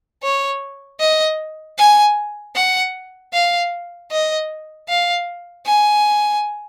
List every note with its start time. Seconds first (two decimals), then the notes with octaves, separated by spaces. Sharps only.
0.23 C#5
1.00 D#5
1.78 G#5
2.56 F#5
3.33 F5
4.11 D#5
4.89 F5
5.66 G#5